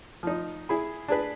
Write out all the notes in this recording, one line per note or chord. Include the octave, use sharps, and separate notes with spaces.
F3 D#4
E4 G#4 B5
D4 G#4 B4